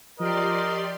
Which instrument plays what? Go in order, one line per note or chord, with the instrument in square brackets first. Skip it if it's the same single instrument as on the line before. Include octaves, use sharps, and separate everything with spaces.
[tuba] F3 [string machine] G4 D5 C6 [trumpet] A#4 [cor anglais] D#5